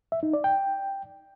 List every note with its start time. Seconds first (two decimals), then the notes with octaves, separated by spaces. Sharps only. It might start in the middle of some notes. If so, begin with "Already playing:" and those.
0.12 E5
0.23 D#4
0.33 D5
0.44 G5